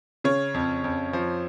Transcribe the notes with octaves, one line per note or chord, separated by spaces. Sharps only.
C#3 C#5
F2
F2
F3